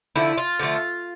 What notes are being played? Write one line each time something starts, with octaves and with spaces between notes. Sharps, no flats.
D3 F3 A3 E4
F4
D3 F3 A3